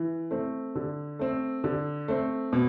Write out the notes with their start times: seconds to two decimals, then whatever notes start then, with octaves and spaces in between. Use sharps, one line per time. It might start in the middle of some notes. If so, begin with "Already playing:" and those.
Already playing: E3
0.31 A3 C4
0.75 D3
1.19 A3 C4
1.64 D3
2.08 A3 C4
2.53 B2